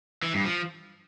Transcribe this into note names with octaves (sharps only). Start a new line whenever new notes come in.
E3
G2
F3